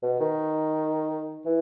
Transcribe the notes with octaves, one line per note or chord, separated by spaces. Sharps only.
B2
D#3
E3